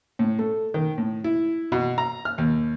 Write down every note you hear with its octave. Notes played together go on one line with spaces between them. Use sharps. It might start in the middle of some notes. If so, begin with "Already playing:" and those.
A2
A3
D#3
A2
E4
B2
A#5
F6
D#2